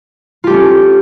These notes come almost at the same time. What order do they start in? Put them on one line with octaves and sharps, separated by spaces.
F4 G4 A3 C#4